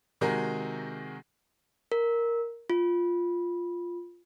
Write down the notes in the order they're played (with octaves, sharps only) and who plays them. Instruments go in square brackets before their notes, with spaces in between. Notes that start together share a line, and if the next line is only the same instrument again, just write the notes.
[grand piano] C3 D#3 G#3 F#4 G#4 A#4
[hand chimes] A#4
F4